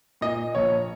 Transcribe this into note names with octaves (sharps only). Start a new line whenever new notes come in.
A#2 D#5
A#1 C#5